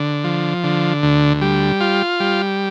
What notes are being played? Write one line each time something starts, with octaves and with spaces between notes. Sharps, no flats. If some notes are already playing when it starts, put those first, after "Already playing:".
Already playing: D3
F3
D3
D2
G3
F4
G3